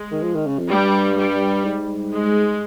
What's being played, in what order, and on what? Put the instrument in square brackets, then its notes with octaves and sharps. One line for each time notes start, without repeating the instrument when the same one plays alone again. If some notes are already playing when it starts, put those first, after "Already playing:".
Already playing: [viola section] G#3
[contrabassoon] D#3
F3
D#3
C#3
F2
[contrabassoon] G2 [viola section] G3
[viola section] G3
[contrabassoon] G#2
[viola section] G#3